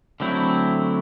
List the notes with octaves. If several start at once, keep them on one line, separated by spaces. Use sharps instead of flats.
D3 F#3 A3 C4 E4